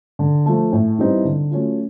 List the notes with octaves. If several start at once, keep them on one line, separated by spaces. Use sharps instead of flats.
D3
F3 A3
A2
E3 G3 C4 D#4
D3
F#3 A3 C#4 F4